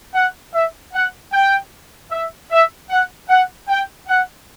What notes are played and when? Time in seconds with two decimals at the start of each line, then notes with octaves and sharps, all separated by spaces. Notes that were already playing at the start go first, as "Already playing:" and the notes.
0.14 F#5
0.53 E5
0.93 F#5
1.32 G5
2.11 E5
2.50 E5
2.90 F#5
3.29 F#5
3.68 G5
4.07 F#5